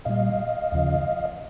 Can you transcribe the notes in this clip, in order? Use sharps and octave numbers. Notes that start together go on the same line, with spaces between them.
A#2 G3 D#5 F5
D#2 C#3 F3